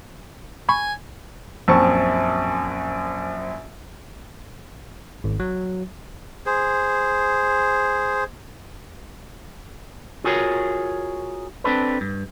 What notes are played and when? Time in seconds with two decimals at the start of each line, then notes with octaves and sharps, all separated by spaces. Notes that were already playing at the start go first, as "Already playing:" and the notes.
0.69 G#5 B5 C#6
1.68 A#1 F#2 C4 A5 C#6
5.24 G#1
5.40 F#3
6.46 G#4 C5
10.24 F4 F#4 G#4 A#4 C#5
11.64 C4 D4 A4 B4
12.01 G2